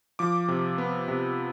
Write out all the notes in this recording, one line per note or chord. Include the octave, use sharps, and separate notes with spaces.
F3 D6
C3
B3
C3